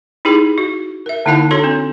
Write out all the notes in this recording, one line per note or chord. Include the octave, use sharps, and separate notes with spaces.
D#4 E4 G4 G#4
F#4
A#4 E5
D3 A#3 D#4 E4 F5 A5
D4 F#4 A4 C#5 C6
C4